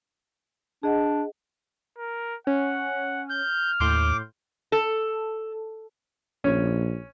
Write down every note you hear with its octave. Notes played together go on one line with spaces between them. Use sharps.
D4 G#4 D#5 F#5
A#4
C#4 F#5
F6 G6
D#2 A2 C6 D6 G6
A4
A#1 C#4